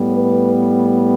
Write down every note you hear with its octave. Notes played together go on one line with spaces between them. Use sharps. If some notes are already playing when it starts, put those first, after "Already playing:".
Already playing: A2 G3 B3
B4